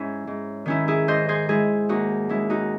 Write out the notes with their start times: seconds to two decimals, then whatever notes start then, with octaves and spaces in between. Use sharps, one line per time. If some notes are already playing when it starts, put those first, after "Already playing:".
Already playing: G#2 C#4 E4
0.27 G#2
0.66 D#3 C#4 E4
0.88 E4 G#4
1.08 G#2 C5 D#5
1.29 G#4 C5
1.49 G#3 E4 G#4
1.89 D#2 D#4 F#4
2.29 G#3 C#4 E4
2.50 D#4 F#4